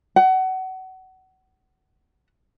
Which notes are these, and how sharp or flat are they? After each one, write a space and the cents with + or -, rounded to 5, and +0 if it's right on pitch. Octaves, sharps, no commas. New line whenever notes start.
F#5 +25